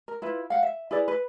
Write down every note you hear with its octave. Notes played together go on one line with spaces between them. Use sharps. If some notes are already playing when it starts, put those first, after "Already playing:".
A#4
E4 F4 B4
F5 F#5
E5
E4 G#4 B4 D5
B4